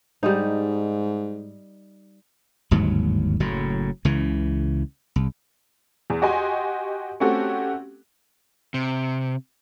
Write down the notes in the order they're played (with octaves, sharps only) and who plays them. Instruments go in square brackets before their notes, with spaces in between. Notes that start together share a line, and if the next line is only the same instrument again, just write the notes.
[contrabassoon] G#2 [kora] G3 D#4
[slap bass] G1 D#2 G#2 F#3
F#1 A2 F#3
C#2 C#3 E3
C2
[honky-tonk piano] E2
F#4 G4 D#5 G#5 C6
A3 C4 C#4 F#4 G4 A4
[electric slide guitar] C3